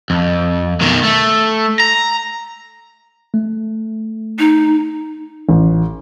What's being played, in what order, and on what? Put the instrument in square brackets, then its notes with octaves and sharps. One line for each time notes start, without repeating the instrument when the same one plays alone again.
[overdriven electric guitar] F2
B1 D#3
A3
A#5
[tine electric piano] A3
[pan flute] D#4
[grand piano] A1